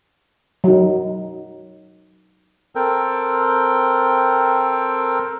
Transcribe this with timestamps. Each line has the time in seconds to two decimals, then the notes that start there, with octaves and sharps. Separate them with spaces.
0.64 F#3 D#4
2.75 C4 A4 A#4 G5